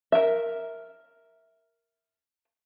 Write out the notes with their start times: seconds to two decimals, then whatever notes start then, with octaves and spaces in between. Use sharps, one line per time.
0.12 A#4 E5